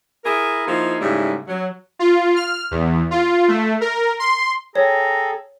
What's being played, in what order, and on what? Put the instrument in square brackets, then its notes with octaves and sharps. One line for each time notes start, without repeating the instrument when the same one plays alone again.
[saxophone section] E4 G#4 A#4
F3 A#3 D#4 E4 G#4
G#2 C#3 G3 A3 E4
F#3
[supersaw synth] F4
F6
E2
F4
A3
A#4
C6
[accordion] G#4 A4 [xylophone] C#5 [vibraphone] G5 [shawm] A#5